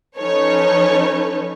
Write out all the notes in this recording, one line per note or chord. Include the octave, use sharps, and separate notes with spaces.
F3 C#4 D#4 A4 B4 C#5